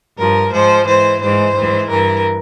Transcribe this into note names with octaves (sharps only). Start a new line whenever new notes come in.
G2 F3 A#4
G#2 F3 C5
G#2 E3 C5
G#2 E3 C5
G#2 E3
G2 E3 A#4